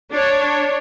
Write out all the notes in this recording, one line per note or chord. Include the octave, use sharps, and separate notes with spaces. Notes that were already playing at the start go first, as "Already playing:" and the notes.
D4 C#5